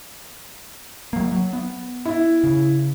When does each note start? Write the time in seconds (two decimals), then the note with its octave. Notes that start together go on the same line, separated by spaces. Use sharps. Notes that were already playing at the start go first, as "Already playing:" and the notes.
1.13 F#3 A#3
1.32 F#3
1.53 B3
2.05 E4
2.44 C#3